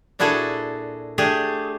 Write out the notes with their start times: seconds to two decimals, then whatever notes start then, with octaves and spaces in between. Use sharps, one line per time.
0.19 A#2 D4 E4 F#4 G#4 A4
1.18 A3 D4 G4 G#4